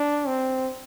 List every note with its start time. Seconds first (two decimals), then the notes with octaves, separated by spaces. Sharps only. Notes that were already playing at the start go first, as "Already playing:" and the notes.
Already playing: D4
0.27 C4